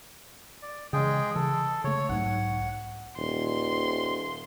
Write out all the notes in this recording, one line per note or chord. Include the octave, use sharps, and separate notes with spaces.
D5
C#3 E3 G#3 G#4 G5
C#3 E3 A4
C#3 A3 C#5
B1 G#2 F#5
D#1 C6